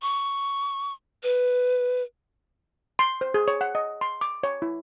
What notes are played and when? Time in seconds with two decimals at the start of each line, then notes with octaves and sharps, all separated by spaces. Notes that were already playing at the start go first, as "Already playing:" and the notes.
0.02 C#6
1.23 B4
2.99 C6
3.21 C5
3.34 G#4
3.48 C#5
3.61 F#5
3.75 D#5
4.01 C6
4.21 D6
4.43 C#5
4.62 E4